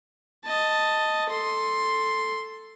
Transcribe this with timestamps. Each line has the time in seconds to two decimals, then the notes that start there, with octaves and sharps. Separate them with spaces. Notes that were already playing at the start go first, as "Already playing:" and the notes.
0.45 D#5 A5
1.30 A4 C6